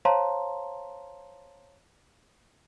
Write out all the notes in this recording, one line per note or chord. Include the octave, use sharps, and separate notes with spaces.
C5 C#5 F5 A5 A#5 C6